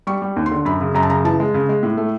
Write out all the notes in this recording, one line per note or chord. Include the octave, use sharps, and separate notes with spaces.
G3 C#6
G3
D#2
C6
D3
F#2 B5
C#3
F#2 A#5
A5
C#3 A#5
E3 A5
G#3
C#3
G#3
A2
A3